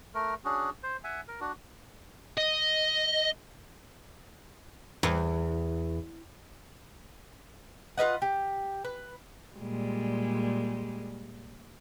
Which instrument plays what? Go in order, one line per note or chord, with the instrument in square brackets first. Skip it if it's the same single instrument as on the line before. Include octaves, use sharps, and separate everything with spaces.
[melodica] A3 A#4
C#4 D4 F#4 G#4
C5
E5 F#5 G#5
A#4
D4 F#4
[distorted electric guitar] D#5
[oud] E2
[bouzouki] F4 B4 D#5 F#5
G4
B4
[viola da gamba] A#2 G3 G#3